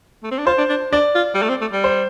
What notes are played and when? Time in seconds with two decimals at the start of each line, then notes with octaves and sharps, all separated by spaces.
0.23 A3
0.31 C4
0.38 D4
0.46 F4 C5
0.58 D4
0.69 D4
0.92 D4 D5
1.15 F4
1.35 G3
1.42 A3
1.49 C4
1.61 A3
1.73 G3
1.84 C5